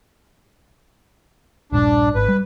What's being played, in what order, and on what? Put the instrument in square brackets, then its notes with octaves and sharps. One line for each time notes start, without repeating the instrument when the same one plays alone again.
[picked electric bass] D#1 A#1 G2 [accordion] D4
[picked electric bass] G#1 [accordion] B4
[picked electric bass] G3